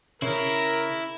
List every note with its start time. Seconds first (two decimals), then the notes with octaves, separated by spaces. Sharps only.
0.22 C#3 E4 A#4